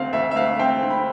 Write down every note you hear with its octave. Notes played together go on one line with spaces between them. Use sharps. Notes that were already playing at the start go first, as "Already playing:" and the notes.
Already playing: D2 C4 F5
D2 E5
E5
D2 F5
C4 G5
C4
B5